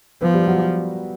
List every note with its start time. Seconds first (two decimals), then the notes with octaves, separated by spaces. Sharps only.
0.21 F3 B3 B4
0.34 G3 G4
0.47 F#3 F#4